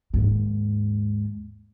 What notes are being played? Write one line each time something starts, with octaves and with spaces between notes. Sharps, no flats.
D#2 G#2